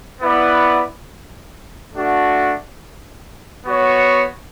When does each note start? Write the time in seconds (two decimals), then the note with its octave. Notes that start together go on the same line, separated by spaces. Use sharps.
0.21 B3 E4 B4 D5 F#5
1.93 A3 D4 F#4
3.65 B3 F#4 C#5